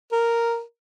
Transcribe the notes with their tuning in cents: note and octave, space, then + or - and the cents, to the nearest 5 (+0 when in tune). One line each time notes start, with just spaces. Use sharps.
A#4 -5